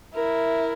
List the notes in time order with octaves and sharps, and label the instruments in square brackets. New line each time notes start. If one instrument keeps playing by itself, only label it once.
[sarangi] E4 [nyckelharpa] A#4